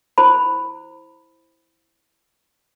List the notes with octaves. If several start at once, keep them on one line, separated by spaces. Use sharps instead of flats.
E4 C5 B5